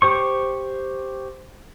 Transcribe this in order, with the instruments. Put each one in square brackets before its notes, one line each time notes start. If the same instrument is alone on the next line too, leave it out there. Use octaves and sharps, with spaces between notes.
[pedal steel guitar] G4 C5 C#6